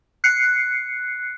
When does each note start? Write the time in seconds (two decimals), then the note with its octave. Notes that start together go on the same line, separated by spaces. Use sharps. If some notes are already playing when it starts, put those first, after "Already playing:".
0.24 F#6 C7 C#7